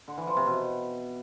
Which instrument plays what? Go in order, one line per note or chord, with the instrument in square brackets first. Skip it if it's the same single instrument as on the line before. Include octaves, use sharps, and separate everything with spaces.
[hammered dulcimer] D3
E3
F3
C3
B2